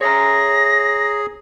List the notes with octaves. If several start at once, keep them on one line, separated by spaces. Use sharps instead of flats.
G#4 C#5 E5 A#5 A#6